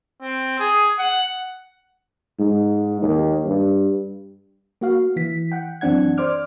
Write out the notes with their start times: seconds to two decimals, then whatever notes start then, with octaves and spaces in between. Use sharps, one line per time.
0.22 C4
0.59 G#4
0.99 F#5
2.39 G#2
3.02 D#2
3.46 G2
4.81 A#3 F#4 F5
5.16 E3 B6
5.52 F#5 G5
5.81 F#2 E3 C4 D4 F#5 G#6
6.18 C5 D5 D6 F6